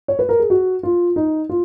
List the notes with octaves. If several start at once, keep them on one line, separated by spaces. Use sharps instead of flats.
C#5
B4
A#4
G#4
F#4
F4
D#4
F4